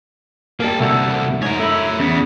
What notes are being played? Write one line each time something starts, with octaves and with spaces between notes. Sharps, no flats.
G3 A#3 G#4 A5
C2 D3 A3 F#4 A4
G#2 A#4 C#5
A3 E4
E2 C#3 B3